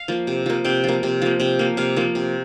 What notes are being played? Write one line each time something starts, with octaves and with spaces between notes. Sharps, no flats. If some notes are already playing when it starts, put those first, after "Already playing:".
Already playing: F5
F3 A#3
C3
F3 A#3
C3 G5
F3 A#3
C3
F3 A#3
C3 G5
F3 A#3
C3 F5
F3 A#3
C3